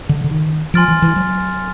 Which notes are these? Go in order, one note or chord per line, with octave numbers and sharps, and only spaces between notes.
D3
D3
D#3
F3 G#5 C6 F6 A6 D7
E3
E3
F#3